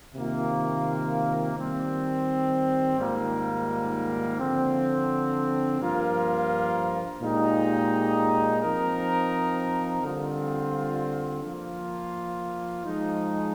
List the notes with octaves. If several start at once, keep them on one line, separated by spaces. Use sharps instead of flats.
C3 D#3 A#3 F4
D#3 G3 C4
G#2 D#3 G3 A#3 F4
D3 F3 C4
G2 F3 A#3 F4 A#4
A#2 G#3 D#4 G4
F3 C4 D#4 A#4
D3 G3 C4 F4
F3 A#3 F4
F3 G#3 D#4